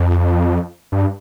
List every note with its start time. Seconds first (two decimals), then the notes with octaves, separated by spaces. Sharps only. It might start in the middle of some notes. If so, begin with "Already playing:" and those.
Already playing: F2
0.92 G2